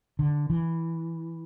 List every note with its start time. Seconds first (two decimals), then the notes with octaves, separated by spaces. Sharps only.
0.19 D3
0.50 E3